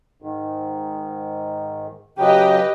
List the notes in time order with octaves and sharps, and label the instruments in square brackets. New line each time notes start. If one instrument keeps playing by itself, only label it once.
[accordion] G#2 D#3
[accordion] C#3 F#3 G5 [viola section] G4 B4 D#5